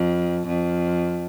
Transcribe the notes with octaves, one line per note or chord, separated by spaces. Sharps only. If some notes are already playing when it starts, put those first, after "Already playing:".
Already playing: F2
F2